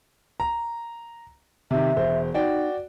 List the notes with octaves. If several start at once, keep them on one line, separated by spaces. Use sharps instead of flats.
A#5
C3 D#3 E5
E1 C5
D#4 F#4 D5 G5